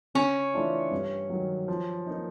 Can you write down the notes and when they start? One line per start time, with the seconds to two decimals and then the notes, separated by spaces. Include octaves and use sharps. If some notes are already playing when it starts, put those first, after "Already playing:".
0.15 C#3 C#4
0.54 E3 A3 D4 F4
0.91 G2
1.30 D#3 F#3
1.68 F3
2.07 A#3 D#4